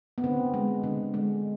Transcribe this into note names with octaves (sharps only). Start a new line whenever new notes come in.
B3
D3 C4
G#3
D3
G#3